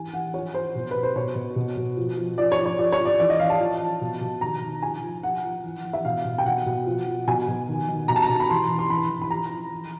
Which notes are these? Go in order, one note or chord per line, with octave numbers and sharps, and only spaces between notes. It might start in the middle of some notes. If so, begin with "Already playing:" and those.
Already playing: E3 G#5
E3 F#5
F3 C#5
F3 C5
B2
B2 B4
C5
B2 C#5
B2
B2
B2
F3
F3
F3 D5
C#5
F3
C#5
F3 D5
C#5
F3
D5
E3 D5
D#5
E3 F5
A5
F3
F3
B2
B2
D#3 A#5
D#3
F3 G#5
F3
F3 F#5
F3
E3
E3
E5
B2 F5
B2
G5
B2 F#5
B2
F3
F3
B2 G#5
B2
D#3
D#3
B2 A#5
A5
A#5
B2
B5
E3 C6
E3
C6
E3 B5
E3
B5
F3 A#5
F3
E3